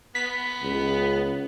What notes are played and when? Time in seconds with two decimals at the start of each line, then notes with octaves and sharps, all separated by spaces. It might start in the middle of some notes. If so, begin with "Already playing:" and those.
0.15 B3 B6
0.62 C#2